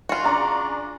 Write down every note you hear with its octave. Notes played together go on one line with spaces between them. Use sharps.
F4 F#4
C#3 D4 D5 A#5 C#6